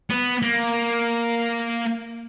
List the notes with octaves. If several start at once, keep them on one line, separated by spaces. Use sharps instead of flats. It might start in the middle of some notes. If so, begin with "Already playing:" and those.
B3
A#3